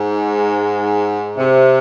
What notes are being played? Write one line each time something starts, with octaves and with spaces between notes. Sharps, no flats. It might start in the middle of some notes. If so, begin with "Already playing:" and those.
Already playing: G#2
C3